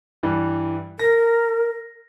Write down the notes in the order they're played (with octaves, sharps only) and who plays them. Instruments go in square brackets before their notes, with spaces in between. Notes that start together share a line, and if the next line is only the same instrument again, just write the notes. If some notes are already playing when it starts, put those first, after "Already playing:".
[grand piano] G2 E3 G3
[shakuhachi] A#4 [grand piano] A#6